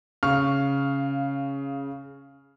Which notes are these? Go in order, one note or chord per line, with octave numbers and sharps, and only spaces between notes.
C#3 F5 C#6 F6